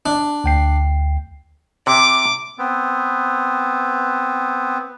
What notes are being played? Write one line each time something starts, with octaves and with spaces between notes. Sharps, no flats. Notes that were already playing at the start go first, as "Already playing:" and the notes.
D4
D2 G5 C7
C3 D6
B3 C4